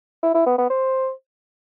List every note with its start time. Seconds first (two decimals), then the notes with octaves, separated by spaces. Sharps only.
0.23 E4
0.35 E4
0.46 B3
0.58 B3
0.70 C5